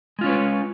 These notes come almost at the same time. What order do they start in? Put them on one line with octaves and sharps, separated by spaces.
G#3 F4 C#4 C#5 B4